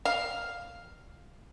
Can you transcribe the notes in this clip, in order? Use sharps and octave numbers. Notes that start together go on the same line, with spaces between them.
F5